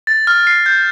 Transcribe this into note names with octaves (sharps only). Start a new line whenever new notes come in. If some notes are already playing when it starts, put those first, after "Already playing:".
A6
F6
C7
G6